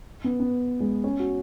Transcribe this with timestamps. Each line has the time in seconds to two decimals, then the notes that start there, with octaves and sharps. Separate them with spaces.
0.24 B3
0.40 B3
0.80 G#3
1.04 C#4
1.19 F#4